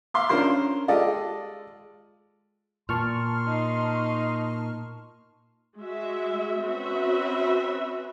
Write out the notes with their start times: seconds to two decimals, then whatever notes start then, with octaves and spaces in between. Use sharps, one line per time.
0.14 E5 F5 C6 D6
0.29 C#4 D4 F4 A#4 C5 C6
0.88 G#3 F4 G4 A4 D5 D#5
2.89 A#2 A5 C6 C#6 F6
3.47 D#4
5.77 G#3 F#4 E5
6.64 C4 C#4 F#4 B4 E5